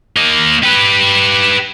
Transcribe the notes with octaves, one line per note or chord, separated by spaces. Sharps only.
A#3 D#5
G4 B4